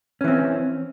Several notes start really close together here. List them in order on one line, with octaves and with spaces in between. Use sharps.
C#4 E3 C4